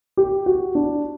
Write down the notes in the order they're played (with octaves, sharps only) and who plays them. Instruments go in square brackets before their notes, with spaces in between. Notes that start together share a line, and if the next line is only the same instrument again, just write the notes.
[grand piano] G4
F#4
D4